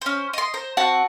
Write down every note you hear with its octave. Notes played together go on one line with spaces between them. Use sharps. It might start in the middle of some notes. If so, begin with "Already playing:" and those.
C#4 C5
D#5 C6
C5 A#5
C4 F#4 F#5 A5